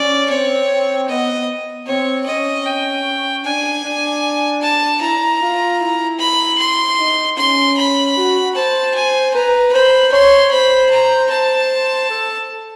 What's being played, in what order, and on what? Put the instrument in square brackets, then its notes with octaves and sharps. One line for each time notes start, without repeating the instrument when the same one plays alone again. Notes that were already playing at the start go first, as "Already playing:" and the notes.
Already playing: [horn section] C#4 [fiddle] D5
[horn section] C4 [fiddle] C#5
[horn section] B3 [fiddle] D#5
[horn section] C4 [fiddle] C#5
[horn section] C#4 [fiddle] D#5
[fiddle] G5
[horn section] D4 [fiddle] G#5
[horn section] D4
[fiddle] A5
[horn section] E4 [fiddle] A#5
[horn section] F4
E4
[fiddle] B5
C6
[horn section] D#4
[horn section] C#4 [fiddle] C6
[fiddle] B5
[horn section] F#4
[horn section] C5 [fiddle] A5
[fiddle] G#5
[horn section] B4 [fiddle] A#5
[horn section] C5 [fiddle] B5
[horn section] C#5 [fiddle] C6
[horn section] C5 [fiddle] B5
[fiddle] A#5
[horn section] C5 [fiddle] A5
[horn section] A4